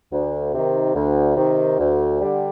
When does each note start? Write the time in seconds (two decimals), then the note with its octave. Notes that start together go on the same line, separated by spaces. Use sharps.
0.12 D2
0.54 C3 D#3
0.95 D2
1.37 C3 D#3
1.79 D2
2.21 D3 G3